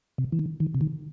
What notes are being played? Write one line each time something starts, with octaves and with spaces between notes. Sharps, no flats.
C3
E3
D#3
D#3
C3
D#3